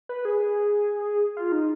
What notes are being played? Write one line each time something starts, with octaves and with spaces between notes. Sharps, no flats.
B4
G#4
F4
D#4